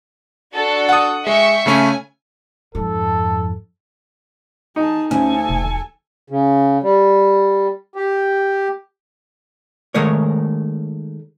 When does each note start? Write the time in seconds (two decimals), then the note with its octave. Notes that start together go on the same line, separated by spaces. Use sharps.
0.54 D4 F#4 A4
0.89 F#5 D#6
1.27 G#3 E5 G5 C#6
1.66 C#3 A3 C#4 G#5
2.75 F2 G#2 A4
4.76 D#4 G#4 A5
5.11 D2 C#4 A4 G#5
5.49 E1
6.30 C#3
6.83 G3
7.96 G4
9.94 D#3 G#3 A3 A#4 C#5